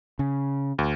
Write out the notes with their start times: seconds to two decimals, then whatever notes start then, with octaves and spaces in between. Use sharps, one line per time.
0.19 C#3
0.79 D2